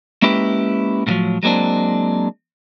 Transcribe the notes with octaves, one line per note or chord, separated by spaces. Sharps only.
G#3 A#3 C#4 E4 G4 B4
A2 C3 D#3 F3 F#3
F#3 G#3 A#3 C4 D4